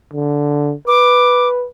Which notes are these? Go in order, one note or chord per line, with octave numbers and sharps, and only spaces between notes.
D3
B4 D6